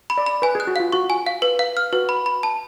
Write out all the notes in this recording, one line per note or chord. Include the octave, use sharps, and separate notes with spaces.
B5
D5
B5
B4 G#5
G#4 F#6
F#4
F4 F5
F#4 C#6
G#5
F5
B4
F5
F6
F#4 B4
B5
B5
A5